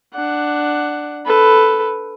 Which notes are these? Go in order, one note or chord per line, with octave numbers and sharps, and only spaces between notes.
D4 F#5
A4 B4